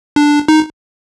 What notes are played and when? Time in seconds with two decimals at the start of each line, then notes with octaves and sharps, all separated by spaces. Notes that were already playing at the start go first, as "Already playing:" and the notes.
0.16 D4
0.48 D#4